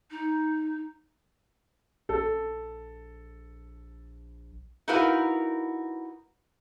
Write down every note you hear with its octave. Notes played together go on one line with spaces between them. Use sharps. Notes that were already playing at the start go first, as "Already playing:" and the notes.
D#4
A#1 A4
D#4 E4 F#4 A#4 B4 F5